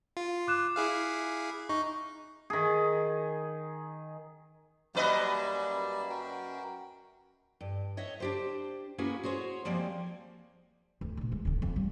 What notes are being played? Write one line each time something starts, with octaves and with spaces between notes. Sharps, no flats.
F4
D6 F#6 E7
E4 G#4 F5
D#4 C#6
D#3 G#4
F#2 G3 A#3 B4 D5 D#5
F#4 A#4 G5
G2
C#5 D#5 E5 F#5
D4 G4 C5
A#3 C#4 E4 F#4 G#4 B4
F#4 G#4 C5 C#5
F3 G3 G#3 A#3 C4
D2
D2 A#2
G#3
D#1 D3
F2
G3 A3